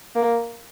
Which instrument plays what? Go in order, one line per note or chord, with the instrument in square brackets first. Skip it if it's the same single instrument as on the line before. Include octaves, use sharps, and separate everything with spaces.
[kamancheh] A#3